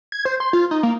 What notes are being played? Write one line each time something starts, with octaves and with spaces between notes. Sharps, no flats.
G#6
C5
C6
F4
D#4
A#3